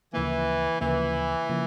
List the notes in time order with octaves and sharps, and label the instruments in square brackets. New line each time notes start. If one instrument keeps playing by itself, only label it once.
[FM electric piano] D2 C#3 F3 A#3 [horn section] E3
[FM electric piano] D2 C#3 F3 A#3 [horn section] E3
[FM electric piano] C#3 F3 A#3